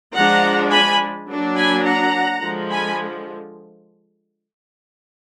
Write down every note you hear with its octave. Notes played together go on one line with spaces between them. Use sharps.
F3 G#3 D4 F#5 A#5
G#5 B5
F#3 A#3 D4
G#5 B5
F#5 A#5
D3 F3 G#3
G#5 B5